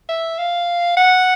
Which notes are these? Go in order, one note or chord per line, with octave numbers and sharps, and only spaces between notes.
E5
F5
F#5